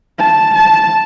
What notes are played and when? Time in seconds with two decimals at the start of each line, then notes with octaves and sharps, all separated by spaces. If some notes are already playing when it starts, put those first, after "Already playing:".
0.19 A5
0.55 A5